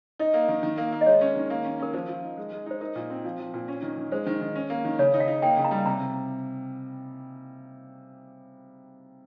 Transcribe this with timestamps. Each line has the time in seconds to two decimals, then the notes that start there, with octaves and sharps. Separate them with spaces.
0.19 D#4 D#5
0.34 A#3
0.48 D#3
0.63 D#3
0.78 A#3
0.92 A#3
1.01 D#5
1.06 G#3 C#5
1.21 C#4
1.36 D#3
1.50 A#3
1.65 C#4
1.79 C#4 A#4
1.93 F3 C5
2.08 F3
2.23 D#4
2.37 G#3
2.52 G#3
2.66 D#4 C5
2.81 D#4 A#4
2.96 A#2
3.10 C4
3.25 F3
3.39 F3
3.54 A#2
3.68 C#4
3.82 D#3
3.97 D#3
4.12 G#3 C5
4.26 D#3
4.41 D#3
4.55 C#4
4.70 A#3
4.85 D#3
4.99 C#3 C#5
5.14 D#4
5.20 F5
5.28 D#4
5.42 A#3 G5
5.57 C#3
5.64 A#5
5.71 G3
5.86 C3 A#5
6.00 C3